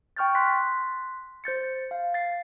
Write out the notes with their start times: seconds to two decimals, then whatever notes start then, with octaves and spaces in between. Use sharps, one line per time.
0.17 G5 C#6 F6 G6 A6
0.35 C6 F#6 B6
1.44 C5 G6 A6 C#7
1.91 F5
2.14 A6 C7